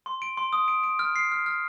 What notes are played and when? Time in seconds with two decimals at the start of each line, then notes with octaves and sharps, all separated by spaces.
0.06 C6
0.22 D7
0.37 C6
0.53 D#6
0.68 D7
0.84 D7
0.99 F6
1.16 C7
1.32 F6
1.46 F6